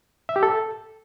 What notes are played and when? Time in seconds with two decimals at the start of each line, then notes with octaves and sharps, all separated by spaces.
0.29 E5
0.36 G4
0.43 A4